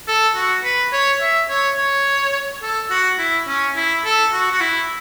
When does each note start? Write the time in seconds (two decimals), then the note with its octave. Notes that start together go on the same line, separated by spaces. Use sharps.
0.08 A4
0.35 F#4
0.64 B4
0.93 C#5
1.21 E5
1.49 C#5
1.78 C#5
2.63 A4
2.91 F#4
3.18 E4
3.48 C#4
3.76 E4
4.04 A4
4.33 F#4
4.52 F#4
4.60 E4